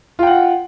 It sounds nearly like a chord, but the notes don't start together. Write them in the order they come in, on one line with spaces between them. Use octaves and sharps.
F4 G5 F#5